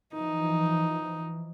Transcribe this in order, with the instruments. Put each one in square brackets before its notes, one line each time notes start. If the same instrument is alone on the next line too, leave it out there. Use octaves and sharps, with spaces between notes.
[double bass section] E3 F3 [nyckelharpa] D#4